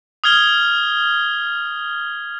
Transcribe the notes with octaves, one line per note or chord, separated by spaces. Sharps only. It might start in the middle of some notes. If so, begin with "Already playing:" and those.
D#6 F6 G#6 G7